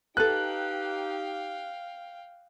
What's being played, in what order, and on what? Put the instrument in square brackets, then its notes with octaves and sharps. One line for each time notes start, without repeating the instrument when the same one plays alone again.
[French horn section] D#4 G4 [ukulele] A4 B4 [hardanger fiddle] F5 G5 [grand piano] F#6